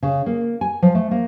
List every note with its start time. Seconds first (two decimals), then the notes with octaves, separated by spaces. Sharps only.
0.03 C#3
0.26 A#3
0.61 G#5
0.82 F3
0.95 A3
1.11 A#3